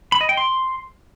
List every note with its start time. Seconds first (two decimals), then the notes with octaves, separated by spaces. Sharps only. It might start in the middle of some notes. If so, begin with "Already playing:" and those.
0.12 B5
0.21 D#5
0.29 G5
0.37 C6